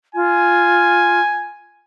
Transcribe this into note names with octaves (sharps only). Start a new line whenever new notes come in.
F4 G#5